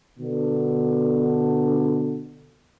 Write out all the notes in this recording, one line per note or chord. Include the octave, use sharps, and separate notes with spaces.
B2 D3